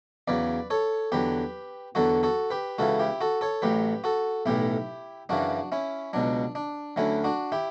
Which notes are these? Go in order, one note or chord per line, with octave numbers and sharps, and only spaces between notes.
E2 C#3 F#3 B4 D5
A4 C#5
E2 D3 F#3 G4 B4
E2 D3 F#3 F#4 A4
F#4 A4
G4 B4
C#2 C#3 E3 F#4 A4
E4 G4
F#4 A4
A4 C#5
A1 A2 F#3 G4 B4
F#4 A4
B1 A2 E3 E4 G4
F#2 C#3 E3 D4 F#4
C#4 E4
C#2 B2 F#3 D4
D4
D2 D3 F#3 C#4 E4
D4 F#4
E4 G4